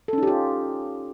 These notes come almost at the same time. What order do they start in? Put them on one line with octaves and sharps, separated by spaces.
A4 C#4 D#4 G4 F4